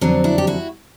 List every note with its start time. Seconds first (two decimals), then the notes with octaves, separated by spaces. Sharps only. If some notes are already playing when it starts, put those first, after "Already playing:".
0.01 F2 D3 F#3 C4 D4
0.24 D4 E4
0.38 G4
0.47 E4 F#4